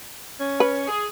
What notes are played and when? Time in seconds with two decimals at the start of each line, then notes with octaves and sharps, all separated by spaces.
0.39 C#4
0.60 B4
0.88 G#4